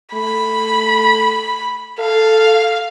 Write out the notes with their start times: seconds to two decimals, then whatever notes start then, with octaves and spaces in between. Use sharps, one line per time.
0.14 A3 B5
1.99 A4 F5